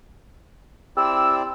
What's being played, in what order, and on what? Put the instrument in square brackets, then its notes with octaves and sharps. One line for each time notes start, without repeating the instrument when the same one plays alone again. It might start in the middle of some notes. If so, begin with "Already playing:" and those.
[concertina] C4 E4 D5 [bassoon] G4 [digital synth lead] E6